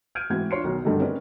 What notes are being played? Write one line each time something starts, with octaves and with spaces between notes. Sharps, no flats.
F6 G6 G#6 D7 D#7
G#2 E3 C4 F#4 G#6
D4 F4 C#5 C6 C7 C#7
B1 B2 D#3
G2 D3 D#3 F#3 A3 D#4
C4 C#4 D#4 A#4 B4 D5